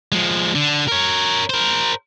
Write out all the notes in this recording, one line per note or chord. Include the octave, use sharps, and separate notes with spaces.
F3 G#3
D3
A#4 C#5
A#4 C5